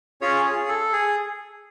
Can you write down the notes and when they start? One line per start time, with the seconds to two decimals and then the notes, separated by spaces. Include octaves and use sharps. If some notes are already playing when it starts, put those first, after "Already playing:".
0.21 C#4 F4 G#4 C#5
0.45 G#4
0.68 A4
0.93 G#4